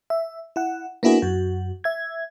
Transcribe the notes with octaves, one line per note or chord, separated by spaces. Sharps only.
E5
E4 F#5
A#3 B3 D4 E4 F#4 G#4
F#2 F#4
E5 G#6